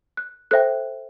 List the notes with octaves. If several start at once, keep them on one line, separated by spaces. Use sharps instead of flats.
F#6
A4 C5 E5 G5 F#6